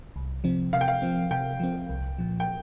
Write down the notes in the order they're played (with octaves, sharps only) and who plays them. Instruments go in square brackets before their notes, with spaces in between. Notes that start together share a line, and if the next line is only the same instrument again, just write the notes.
[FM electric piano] C2
C3 F3 C4
[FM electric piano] C3 [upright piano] F5
[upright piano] G5
F5
[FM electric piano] F3 C4
[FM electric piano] C3 [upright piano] G5
[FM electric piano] F3 C4
C2
A#2 F3
[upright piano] G5